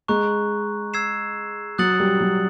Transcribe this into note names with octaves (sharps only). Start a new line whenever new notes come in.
G#3 A#5 C#6 F#6
E6 G#6 C7 E7
F#3 D#6 F#6 A6 C#7 F#7
G3
F#3